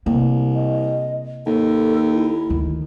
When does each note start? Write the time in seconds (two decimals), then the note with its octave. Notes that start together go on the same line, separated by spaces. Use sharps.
0.06 C2 C3 A#3
0.55 D#5
1.46 D#2 A4
2.14 E4
2.50 D2 D#3